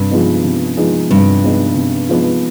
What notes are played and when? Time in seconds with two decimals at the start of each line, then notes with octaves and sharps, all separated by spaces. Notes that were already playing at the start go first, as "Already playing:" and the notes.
Already playing: G2 C3
0.11 F3 G#3 B3 D#4
0.44 C3
0.77 F3 G#3 B3 D#4
1.10 G2 C3
1.43 F3 G#3 B3 D#4
1.76 C3
2.09 F3 G#3 B3 D#4